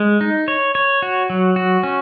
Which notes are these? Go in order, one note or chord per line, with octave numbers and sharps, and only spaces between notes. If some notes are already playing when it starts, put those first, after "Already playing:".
Already playing: G#3
D#4
C#5
C#5
F#4
F#3
F#4
C#4